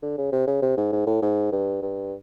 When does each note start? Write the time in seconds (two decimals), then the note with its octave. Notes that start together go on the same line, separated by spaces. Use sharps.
0.03 D3
0.18 C#3
0.32 C3
0.47 C#3
0.62 C3
0.77 G#2
0.93 G#2
1.07 A2
1.22 G#2
1.52 G2
1.82 G2